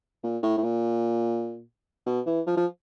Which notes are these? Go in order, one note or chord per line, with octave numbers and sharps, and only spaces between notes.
A#2
A2
A2
A#2
B2
E3
F3
F3